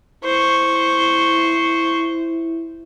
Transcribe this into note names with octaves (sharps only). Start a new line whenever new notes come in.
E4 C5 C#6